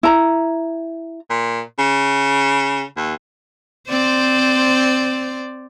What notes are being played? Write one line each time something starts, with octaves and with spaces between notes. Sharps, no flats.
E4 A#5
A#2
C#3
D#2
C4 C5 D5